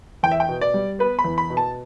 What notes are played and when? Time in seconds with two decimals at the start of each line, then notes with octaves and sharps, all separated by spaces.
0.23 E2 G5
0.31 E5
0.40 G5
0.49 B2
0.61 D5
0.74 G3
0.99 B3 B4
1.19 B5
1.24 E2
1.38 B5
1.50 B2
1.57 A5